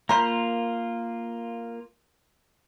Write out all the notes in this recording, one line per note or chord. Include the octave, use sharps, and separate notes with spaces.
A#3 F4 A#4 C5 B5